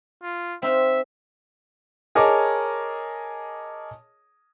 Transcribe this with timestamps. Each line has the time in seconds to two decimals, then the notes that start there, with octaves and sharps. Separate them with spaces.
0.23 F4
0.62 C4 D#4 E5 F5
2.15 G#4 A#4 C#5 D#5 A5 D6